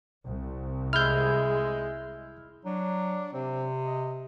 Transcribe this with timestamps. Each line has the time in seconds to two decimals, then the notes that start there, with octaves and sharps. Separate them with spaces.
0.25 C2
0.93 G#3 E4 F6 G6
2.65 F#3 D4
3.33 C3 C4
3.84 D#5